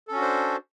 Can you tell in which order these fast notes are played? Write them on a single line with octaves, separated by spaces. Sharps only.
A4 C#4 F#4 D4 C5